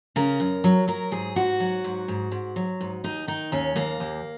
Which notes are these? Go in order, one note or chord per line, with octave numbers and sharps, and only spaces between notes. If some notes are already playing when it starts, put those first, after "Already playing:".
C#3 A#4
F#2
F#3
F#3 A#4
G#2 G#4
G#2 F#4
F#3
G#2
G#2
G#2
F#3
G#2
D#2 D#4
D#3 D#4
D#2 C#4
D#2 A#3
D#2